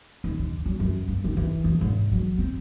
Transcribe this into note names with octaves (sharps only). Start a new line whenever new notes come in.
D#2
D3
F#3
F#2
G2
D#3
E3
F2
G#1
F#3
C4